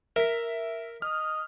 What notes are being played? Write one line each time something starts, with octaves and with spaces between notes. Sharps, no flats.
A#4 E5 B6
D#5 F6